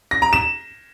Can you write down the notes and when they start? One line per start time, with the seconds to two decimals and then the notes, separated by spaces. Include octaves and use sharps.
0.11 A#6
0.22 A#5
0.33 E7